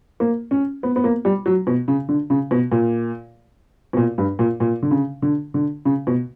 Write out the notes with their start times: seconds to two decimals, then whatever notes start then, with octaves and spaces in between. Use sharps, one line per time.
0.20 A#3
0.51 C#4
0.83 B3
0.96 B3
1.04 A#3
1.25 G3
1.46 F#3
1.67 B2
1.88 C#3
2.09 D3
2.30 C#3
2.51 B2
2.72 A#2
3.93 B2
3.97 A#2
4.18 G2
4.39 A#2
4.60 A#2
4.83 D3
4.91 C#3
5.22 D3
5.54 D3
5.85 C#3
6.07 B2